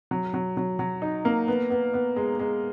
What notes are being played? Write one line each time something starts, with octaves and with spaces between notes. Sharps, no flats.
F#3
F#3
F#3
F#3
D#4
A#3
B3
B3
B3
G#3
G#3